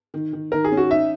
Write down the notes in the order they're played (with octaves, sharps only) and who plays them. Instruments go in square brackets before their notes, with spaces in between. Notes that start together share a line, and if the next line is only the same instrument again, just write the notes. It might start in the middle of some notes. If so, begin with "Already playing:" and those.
[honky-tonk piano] D#3
D#3
[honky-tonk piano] D#3 [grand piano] A#4
[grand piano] G#4
[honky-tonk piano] C#4
[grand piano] F#4
[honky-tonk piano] D#4 [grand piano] E5